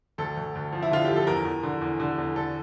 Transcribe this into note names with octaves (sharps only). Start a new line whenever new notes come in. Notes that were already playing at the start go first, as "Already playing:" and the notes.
D2 A4
D2
D2
F3
E4
D3 F4
F3 G4
A4
E2 A#4
E2
D3
E2
D3
E2
D3 A4